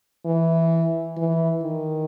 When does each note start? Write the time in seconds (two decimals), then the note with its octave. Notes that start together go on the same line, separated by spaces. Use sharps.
0.25 E3
1.17 E3
1.62 D#3